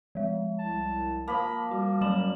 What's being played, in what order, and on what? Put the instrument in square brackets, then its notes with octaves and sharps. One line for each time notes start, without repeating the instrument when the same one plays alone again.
[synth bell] F3 G#3
[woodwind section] C2 A5
[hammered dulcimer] F3 A#3 [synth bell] A5 [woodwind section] B5
[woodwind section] G3 [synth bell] F#4
[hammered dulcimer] F#2 [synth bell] F#3 E7 F#7